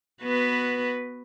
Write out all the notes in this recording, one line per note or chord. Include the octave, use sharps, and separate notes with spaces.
B3 F#4 B4